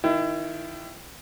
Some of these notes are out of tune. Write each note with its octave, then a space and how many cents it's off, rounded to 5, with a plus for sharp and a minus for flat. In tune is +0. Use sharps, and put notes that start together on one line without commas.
D#3 +10 E4 +30